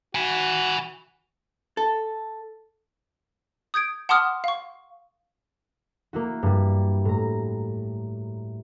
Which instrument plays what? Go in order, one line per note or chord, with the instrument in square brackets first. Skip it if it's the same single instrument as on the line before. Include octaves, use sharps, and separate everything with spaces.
[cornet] F#4 [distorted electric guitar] G#5 B5
[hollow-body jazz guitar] A4
[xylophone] D#6 G6 G#6 D7
F#5 A5 C6 D6 D#6 F6
F5 C#6
[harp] A#3 E4 F#4
G2 G3
A2 A#5